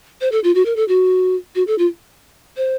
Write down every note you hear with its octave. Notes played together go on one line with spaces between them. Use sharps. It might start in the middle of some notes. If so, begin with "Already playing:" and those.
C5
A4
F4
F#4
A#4
A4
F#4
F#4
A4
F4
C5